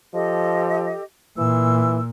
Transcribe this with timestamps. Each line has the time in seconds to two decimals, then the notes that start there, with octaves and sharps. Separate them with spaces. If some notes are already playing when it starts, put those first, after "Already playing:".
0.14 F3 G4 A4 D#5
1.38 A#2 E3 E6